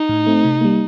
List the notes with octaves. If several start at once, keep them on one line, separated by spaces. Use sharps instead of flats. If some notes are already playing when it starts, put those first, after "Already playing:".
Already playing: D#4
A2
A3 C4
C3
G3 A#3